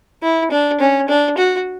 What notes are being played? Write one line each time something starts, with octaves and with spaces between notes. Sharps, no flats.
E4
D4
C#4
D4
F#4